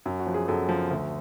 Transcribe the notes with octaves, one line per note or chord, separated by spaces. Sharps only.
F#2
F#4
F3
G#4
F#2 A4
F3
D2